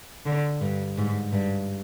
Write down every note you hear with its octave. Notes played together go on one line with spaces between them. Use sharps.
D3
G2
G#2
G2